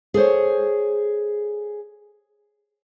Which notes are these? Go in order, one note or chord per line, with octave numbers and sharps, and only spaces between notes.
G#4 A4 C5 C#5